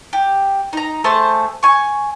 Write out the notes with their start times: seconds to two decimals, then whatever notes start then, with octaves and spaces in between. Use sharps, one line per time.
0.13 G4
0.73 D#4 A#5
1.04 A3 G#4 C5 A5
1.63 G#5 C#6